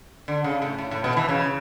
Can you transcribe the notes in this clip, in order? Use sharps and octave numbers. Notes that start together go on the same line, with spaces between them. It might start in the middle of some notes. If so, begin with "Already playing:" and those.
D3
C#3
A2
A2
A2
B2
E3
C#3